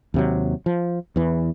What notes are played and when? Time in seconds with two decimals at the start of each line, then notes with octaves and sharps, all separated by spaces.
0.14 D#2 C3 F#3
0.66 F3
1.16 E2 E3